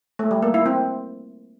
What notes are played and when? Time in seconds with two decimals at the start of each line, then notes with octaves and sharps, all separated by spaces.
0.19 A3
0.31 G3
0.42 A#3
0.54 E4
0.66 C4